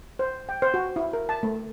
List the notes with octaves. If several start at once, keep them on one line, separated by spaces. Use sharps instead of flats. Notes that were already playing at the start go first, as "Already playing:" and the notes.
C5
G5
C5
F#4
E4
A#4
A5
A3